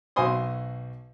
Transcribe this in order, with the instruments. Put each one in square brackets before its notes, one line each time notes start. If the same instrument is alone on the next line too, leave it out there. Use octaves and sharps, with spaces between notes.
[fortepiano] B1 F#4 C5 G#5 C6 D#6